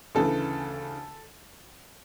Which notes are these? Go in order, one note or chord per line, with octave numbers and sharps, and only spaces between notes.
D2 C#3 E3 A4